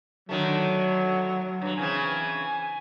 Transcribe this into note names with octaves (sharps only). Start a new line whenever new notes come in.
D3 D#3 F#3 A3
G2 F#3
C#3 E3 C4 G#5